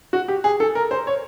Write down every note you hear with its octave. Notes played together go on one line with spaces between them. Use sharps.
F#4
G4
G#4
A4
A#4
C5
C#5